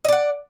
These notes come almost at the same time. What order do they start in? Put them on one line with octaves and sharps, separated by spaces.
D#5 D5 F#5